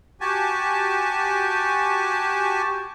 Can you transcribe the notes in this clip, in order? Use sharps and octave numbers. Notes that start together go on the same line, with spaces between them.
F#4 G4 G#5 A5